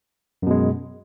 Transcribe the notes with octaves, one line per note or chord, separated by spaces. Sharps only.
F#2 B2 G#3